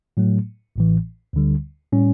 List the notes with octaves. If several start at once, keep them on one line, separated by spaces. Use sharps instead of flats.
A2 F#3 A3
A1 A2 E3
D2 D3 G3
A2 G3 C#4